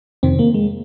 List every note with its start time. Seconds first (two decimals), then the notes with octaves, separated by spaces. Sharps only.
0.23 F2 C3 D#3 C4
0.39 A#3
0.54 G#3